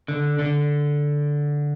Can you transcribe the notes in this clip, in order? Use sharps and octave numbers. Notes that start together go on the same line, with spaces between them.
D3
D3